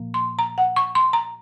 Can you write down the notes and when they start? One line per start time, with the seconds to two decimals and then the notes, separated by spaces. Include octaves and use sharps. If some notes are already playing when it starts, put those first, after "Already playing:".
Already playing: A#2 F3 A#3
0.14 C6
0.39 A#5
0.58 F#5
0.76 C#6
0.95 C6
1.13 A#5